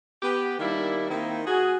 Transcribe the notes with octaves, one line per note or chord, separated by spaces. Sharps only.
B3 G4
D#3 G3 A#3 D4 E4
D#3 A#3 C4 D#4 E4
F#4 G#4